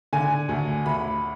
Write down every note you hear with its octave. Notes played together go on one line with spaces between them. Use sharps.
D3 G#5
D2
D2 B5